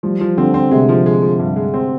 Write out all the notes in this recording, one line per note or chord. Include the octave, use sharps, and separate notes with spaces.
F3 G3
F3
D3 C4
C4
C3 G#3
F3
G#3
F3
G2
G#3
C4